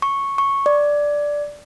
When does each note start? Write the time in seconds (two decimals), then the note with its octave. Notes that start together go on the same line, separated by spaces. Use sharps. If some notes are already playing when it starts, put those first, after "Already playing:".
0.02 C#6
0.38 C#6
0.66 D5